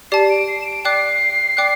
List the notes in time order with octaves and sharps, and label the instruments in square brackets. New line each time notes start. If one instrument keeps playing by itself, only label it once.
[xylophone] G4 D5 A5 [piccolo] C7
[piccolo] D7
C7
E7
D7
[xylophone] D5 G5 D6 F#6 [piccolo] C7
[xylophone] D5 G5 D6 F#6